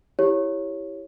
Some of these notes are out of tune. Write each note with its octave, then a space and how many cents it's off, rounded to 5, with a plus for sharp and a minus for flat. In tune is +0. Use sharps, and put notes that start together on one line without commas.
E4 +0 G4 +10 C#5 +0